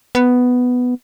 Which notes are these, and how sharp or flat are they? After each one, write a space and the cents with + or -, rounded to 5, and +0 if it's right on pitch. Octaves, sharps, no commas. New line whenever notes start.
B3 +5